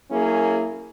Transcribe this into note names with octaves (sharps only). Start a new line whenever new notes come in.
F#3 A#3 C#4 E4 G#4